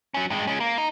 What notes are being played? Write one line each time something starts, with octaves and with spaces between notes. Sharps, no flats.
F#3 C#4
G2 G#3
G#3 C#4
A#3
D#4